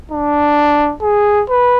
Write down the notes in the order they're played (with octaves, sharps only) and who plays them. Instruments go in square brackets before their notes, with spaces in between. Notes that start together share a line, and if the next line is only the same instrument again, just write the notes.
[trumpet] D4
G#4
B4